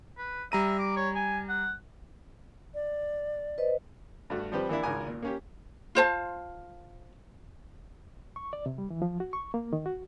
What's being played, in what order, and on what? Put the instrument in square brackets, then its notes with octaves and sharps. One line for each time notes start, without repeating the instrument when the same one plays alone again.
[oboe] B4
[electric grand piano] G3 A#5 D#7 [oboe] E5
[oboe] D6
C#5
G#5
F#5
[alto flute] D5
[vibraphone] B4 C5 D#5
[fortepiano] G2 A3 F#4
F3 G3 C4 G4 B4 C5
E3 A#3 D4 E4
G#1 C#2 A#4 G#5 D6
A#2
A#3 C#4 G4
[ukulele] F4 C5 A5
[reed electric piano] C#6
D5
C3
G3
E3
F3
F#4
C#6
A#3
D#3
F#4